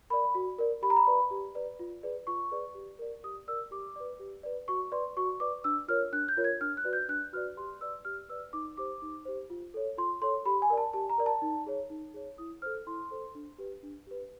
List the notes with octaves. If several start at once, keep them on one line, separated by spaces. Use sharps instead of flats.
A#4 D5 B5
F#4
A#4 D5
G4 B5
A#5
B5
B4 D5
G4
B4 D5
F4
G#4 B4 D5
F4 C#6
G#4 B4 D5
G4
A#4 D5
G4 D#6
A#4 D5 E6
G4 D6
B4 D5
G4
B4 D5
F#4 C#6
B4 D5 C6
F#4 C#6
B4 D5 D6
D4 E6
F4 A#4 C#5 F6
D4 F#6
G6
F4 A#4 C#5
G#6
D4 F6
F#6
F#4 B4 D5
G6
D4 F#6
F#4 B4 D5 F6
G4 C6
B4 D5 E6
G4 F6
B4 D5 E6
D#4 D6
G4 C5 D6
D#4
G4 C5
F4
A4 C#5
F4 C6
A4 C#5 C6
G4 B5
G#5
A#4 D5
A5
G4 A5
A#5
A#4 D5
A5
D#4
G#4 C#5
D#4
G#4 C#5
E4 D#6
A4 C5 F6
E4 C6
A4 C5
D4
G4 B4
D4
G4 B4